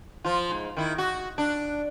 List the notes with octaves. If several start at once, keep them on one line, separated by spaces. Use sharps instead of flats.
F3 F4
G#2
D#3 E4
F#4
D4